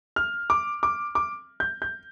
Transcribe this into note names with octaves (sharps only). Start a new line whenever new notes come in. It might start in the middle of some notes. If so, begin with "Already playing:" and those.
F6
D6
D6
D6
G6
G6